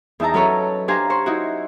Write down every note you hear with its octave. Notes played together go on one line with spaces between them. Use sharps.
E2 D#4 E5 A5 A#5
F#3 C#4 A4 B4 C#5
D4 G4 C5 F5 G#5 A#5
C5 C#6
D#4 E4 F#4